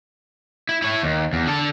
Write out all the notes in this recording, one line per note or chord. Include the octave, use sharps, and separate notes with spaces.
E4
E4 C#5
D#2
E2
D3 A4